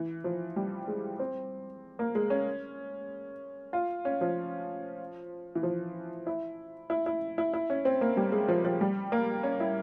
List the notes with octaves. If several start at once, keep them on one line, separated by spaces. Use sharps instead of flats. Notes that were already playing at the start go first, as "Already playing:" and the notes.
Already playing: E3
F3
G3
G#3
C4
A#3
G#3
C#4
F4
C#4
F3
E3
F3
E4
E4
E4
E4
E4
C#4
C4
A#3
G3
G#3
F3
F3
G3
A#3
C#4
E4